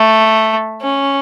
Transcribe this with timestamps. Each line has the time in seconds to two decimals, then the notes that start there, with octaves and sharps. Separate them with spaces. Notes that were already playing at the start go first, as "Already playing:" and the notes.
Already playing: A3
0.82 C#4